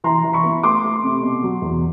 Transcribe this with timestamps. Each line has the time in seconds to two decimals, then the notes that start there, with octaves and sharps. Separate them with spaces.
0.04 E3 A#5 C6
0.24 E3
0.33 B5 C#6
0.44 B3
0.63 A3 C6 D6
0.84 A3
1.03 C3
1.22 B2
1.43 F#3
1.62 E2